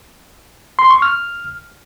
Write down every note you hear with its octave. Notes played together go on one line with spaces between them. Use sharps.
C6
C#6
F6